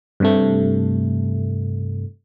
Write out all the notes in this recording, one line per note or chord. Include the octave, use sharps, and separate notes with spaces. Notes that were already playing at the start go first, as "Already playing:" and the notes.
G2 C3 A3